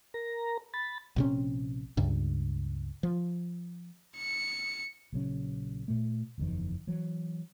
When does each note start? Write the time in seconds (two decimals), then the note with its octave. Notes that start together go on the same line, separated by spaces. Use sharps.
0.14 A#4 A#5
0.74 B5 A6
1.16 A#1 C3 C#4
1.97 C#2 G2
3.03 F3
4.17 C#7
5.13 A#1 C#3 F#3 C#4
5.88 A#2 A3
6.38 F#1 E2 D#3 F3
6.87 E3 F#3